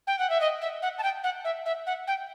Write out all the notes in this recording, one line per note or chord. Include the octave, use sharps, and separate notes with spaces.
G5
F#5
E5
D#5
E5
F#5
A5
G5
F#5
E5
E5
F#5
G5